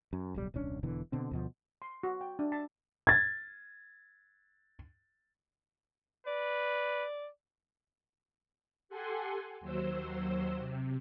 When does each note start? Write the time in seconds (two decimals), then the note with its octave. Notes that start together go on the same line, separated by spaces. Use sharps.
0.13 F#2
0.34 D1 B1 G3
0.54 D#1 C2 C#4 D4
0.83 E1 B2 D3 E3
1.12 B2 D3 C4
1.31 D2 B2 F3
1.82 C6
2.03 F#4
2.21 G5
2.39 D4
2.52 A5
3.07 G#6 A6
6.27 B4 D5
8.89 G4 A4 F#5 G#5 C6
9.61 D#2 F#3 C5 E6
10.57 C3